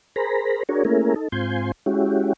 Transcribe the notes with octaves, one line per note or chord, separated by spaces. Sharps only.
G#4 A#4 C5 A#5 B5
D4 F#4 G#4 A#4 C#5
A3 A#3 C#4 E4 G#4 A#4
D#4 A4
G#2 C4 F4 G#5 C6 G6
G#3 C#4 E4 F#4 G4